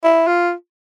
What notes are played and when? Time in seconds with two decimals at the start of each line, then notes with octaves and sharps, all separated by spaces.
0.04 E4
0.27 F4